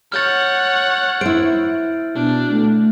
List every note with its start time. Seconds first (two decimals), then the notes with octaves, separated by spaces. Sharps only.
0.12 C#5 F#5 F6 G6 A6
1.21 E4 C5 D7
2.16 B2 D4
2.51 A3